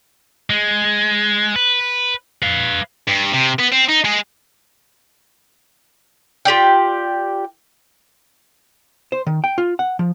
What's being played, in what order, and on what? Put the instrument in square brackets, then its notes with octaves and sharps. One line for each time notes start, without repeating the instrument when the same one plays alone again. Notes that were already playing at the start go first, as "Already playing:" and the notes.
[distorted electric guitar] G#3
B4
B4 F5
G2
C3
B3
C4
D#4
G#3 G#4
[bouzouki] F4 G4 D5 G5
[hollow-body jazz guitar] C5
D#3
G5
F4
F#5
F3